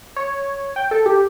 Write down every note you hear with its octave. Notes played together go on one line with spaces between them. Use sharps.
C#5
G5
A4
G4